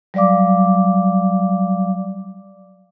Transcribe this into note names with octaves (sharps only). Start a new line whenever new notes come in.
F#3 G3 D5 F5 D6